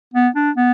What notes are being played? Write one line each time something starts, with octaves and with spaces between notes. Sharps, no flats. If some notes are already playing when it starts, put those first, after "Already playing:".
B3
D4
B3